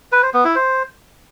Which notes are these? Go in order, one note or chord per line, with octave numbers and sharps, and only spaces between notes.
B4
C5
B3
E4
C5